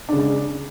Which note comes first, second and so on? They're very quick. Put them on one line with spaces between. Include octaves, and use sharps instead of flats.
D4 C#3 G#3